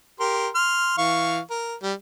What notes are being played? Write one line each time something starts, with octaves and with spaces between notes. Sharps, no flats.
G4 A#4 C6
C6 F6
E3 F5 C#6
A#4
G3